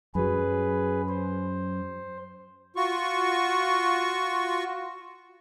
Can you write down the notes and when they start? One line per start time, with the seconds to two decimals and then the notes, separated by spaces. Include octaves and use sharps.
0.15 F#2 F#3 G#4 B4
1.09 C5
2.76 F4 F#4 C#6